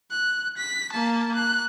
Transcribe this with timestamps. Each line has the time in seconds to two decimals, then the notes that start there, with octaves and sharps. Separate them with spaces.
0.11 F#6
0.57 B6
0.92 A#3 A5
1.35 F#6